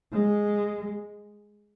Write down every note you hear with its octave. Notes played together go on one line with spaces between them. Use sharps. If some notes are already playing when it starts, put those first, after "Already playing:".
G#3